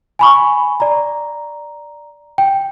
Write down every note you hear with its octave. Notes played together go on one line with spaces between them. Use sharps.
G#5 B5 C#6
D5 A#5
G5